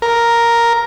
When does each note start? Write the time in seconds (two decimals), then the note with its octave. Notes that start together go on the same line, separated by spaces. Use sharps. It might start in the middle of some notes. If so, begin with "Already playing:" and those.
0.02 A#4